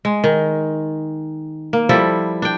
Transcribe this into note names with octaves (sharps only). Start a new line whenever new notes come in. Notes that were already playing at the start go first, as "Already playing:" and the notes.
G#3
D#3
A#3
F3 G3 E4 A4
D4 G5